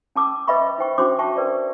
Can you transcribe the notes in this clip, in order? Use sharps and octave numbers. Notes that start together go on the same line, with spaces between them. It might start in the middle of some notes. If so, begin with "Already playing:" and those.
C#4 A5 D6 E6
B4 D#5 E5 G5 B5 C#6
D#4 C5 G5 C#6
C#4 D4 F#4 C5 C6 D6
C5 E5 G5 A5 C#6
A#4 B4 D5